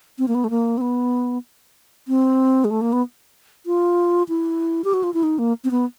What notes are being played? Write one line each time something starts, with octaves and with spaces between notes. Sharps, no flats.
C4
A#3
B3
A3
A#3
C4
B3
C4
G#3
A3
A#3
B3
F4
E4
G4
F#4
F4
E4
D#4
A#3
C4
B3